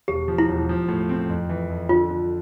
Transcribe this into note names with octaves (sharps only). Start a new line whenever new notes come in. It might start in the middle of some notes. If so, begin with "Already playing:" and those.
E1 G4
F3
E4
E1
F3
A2
C4
F2
E3
F2
D3 F4
D3